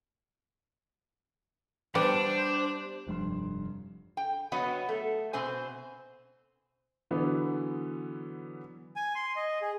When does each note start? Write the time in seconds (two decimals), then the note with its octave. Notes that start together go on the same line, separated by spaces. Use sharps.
1.95 G3 B3 D4 C5
3.07 F1 G2 C6
4.17 G5
4.52 F#3 B3 C#5 D#5 F#5
4.89 A3
5.33 B2 C4 C5 G#5
7.11 D3 E3 F#3 B3
8.96 G#5
9.15 C6
9.36 D#5
9.62 G#4